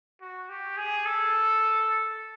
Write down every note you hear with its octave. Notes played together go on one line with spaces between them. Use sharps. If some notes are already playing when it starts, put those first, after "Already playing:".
F#4
G4
G#4
A4